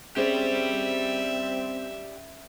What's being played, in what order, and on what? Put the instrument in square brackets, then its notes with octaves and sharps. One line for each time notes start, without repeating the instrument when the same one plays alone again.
[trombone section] C4 [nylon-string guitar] C#4 G#4 C5 [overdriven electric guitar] G4 D5 [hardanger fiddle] E5